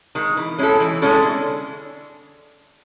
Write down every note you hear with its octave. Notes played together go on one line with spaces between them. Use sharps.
D#3 G#3
E3
G#3 C#4 E4 A4
E3
G#3 C#4 E4 A4
D3